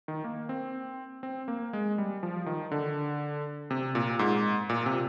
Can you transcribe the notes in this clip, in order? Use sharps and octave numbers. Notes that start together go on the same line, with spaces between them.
D#3
A#3
C4
C4
A#3
G#3
G3
F3
D#3
D3
C3
A#2
G#2
A#2
C3